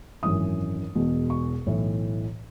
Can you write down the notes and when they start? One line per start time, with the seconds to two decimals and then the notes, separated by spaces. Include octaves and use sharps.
0.23 G#1 F#2 E3 D#6
0.95 E1 E2 B2
1.30 C#6
1.66 B1 A2 E3